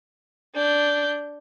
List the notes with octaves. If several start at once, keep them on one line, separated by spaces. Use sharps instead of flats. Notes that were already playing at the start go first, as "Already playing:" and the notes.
D4 G6